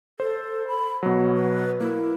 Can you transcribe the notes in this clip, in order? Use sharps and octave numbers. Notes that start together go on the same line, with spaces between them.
A4 C5
B5
B2 F#3 F#5
B4
A#3 E4